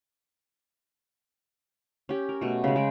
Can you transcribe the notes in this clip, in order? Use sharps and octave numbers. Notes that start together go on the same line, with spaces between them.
C#4 G4
A#4
B2 A3
C#3 G#3
G#3 G5